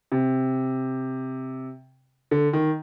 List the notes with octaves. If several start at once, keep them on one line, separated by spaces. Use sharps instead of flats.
C3
D3
D#3